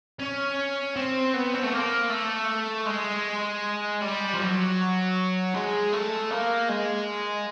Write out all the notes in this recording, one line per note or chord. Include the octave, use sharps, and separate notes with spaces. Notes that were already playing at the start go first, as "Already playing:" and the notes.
C#4
C4
B3
C4
A3
A#3
A3
G#3
G3
F3
F#3
G#3
A3
A#3
G#3